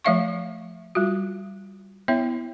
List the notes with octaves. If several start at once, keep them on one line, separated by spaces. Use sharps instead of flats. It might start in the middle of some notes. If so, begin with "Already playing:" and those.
F3 A3 C#5 E5 F5 C#6
G3 F4 F#4
B3 E4 C#5 E5